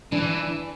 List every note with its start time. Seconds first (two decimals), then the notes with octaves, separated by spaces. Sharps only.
0.12 E3 D4